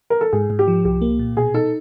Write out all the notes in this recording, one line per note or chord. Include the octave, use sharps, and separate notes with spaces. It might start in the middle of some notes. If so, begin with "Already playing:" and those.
A#4
A4
G#2 G#4
G#2
G4
F3
C2 G4
A#3
A#2
B2 G#4
D#4 A4